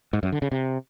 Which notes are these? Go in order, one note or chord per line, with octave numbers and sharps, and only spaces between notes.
G#2
F#2
D3
C#3
C3